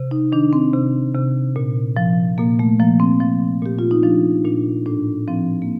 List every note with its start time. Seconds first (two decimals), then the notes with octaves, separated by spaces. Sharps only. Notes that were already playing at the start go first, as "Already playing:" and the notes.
Already playing: C3
0.11 D#4
0.32 D#3 D4
0.53 C4
0.73 C3
1.15 C3
1.56 A#2
1.97 F3
2.38 A#2 A#3
2.59 A3
2.79 F3 A#3
3.00 C4
3.20 F3
3.62 A#2 G4
3.79 F4
3.91 D#4
4.03 F3 D4
4.45 A#2 D4
4.86 A2 D4
5.28 F3 C4
5.62 A#3